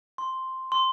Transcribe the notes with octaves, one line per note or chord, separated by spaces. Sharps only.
C6
C6